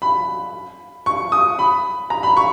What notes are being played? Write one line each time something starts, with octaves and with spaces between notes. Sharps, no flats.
B5
C#6
D#6
B5
A#5
B5
C#6